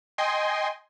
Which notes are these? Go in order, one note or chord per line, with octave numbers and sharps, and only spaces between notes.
D#5 G5 G#5 C6